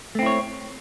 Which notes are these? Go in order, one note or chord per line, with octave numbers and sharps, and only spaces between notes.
A3 C4 E4 C#5